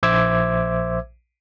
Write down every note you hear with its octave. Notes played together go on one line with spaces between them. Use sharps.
A#1 C5 E5 D6 E6 G#6